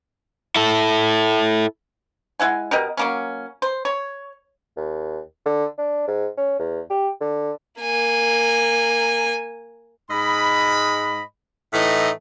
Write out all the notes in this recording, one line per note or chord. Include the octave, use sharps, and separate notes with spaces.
E4 A4
G#3 E4 F#5 G#5
B2 G4 A#4 D#5
F#3 A#3 C#4
C5
C#5
D#2
D3
D4
G#2
C#4
E2
G4
D3
A#3 G#5
G#2 G#3 D#5 B5
A2 E3 A3 D#4 D#5